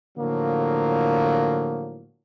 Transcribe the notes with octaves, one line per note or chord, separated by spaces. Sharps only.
A2 D3 F3 F#3 A#3